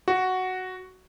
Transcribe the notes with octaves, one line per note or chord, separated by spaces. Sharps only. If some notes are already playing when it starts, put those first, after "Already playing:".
F#4